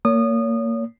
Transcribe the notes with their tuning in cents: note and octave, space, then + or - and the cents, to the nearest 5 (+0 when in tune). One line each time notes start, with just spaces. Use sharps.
A#3 -20 C#5 +30 D#6 -25